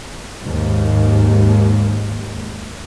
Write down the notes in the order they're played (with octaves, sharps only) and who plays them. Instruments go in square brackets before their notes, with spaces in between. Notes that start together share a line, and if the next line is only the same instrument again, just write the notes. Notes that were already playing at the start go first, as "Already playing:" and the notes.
[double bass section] D#2 G#2